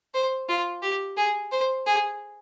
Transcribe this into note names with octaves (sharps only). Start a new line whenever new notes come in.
C5
F4
G4
G#4
C5
G#4